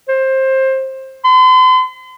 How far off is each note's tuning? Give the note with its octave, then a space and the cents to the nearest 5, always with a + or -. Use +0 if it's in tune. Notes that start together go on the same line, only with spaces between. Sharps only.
C5 +20
C6 -40